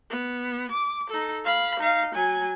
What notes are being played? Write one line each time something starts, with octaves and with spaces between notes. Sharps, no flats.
B3
D6
D#4 A4
F5 B5
D#4 F5
F#3 G#5